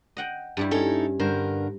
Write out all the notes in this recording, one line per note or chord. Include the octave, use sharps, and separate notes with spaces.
D#5 F#5 G5
G2 G3 E4
C#4 D#4 E4 A4
G2 D3 A#4 C5